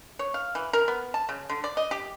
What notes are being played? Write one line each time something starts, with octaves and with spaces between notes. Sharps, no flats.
C#5
F5
E3
A#4
B3
A5
C#3
D3
D5
D#5
G4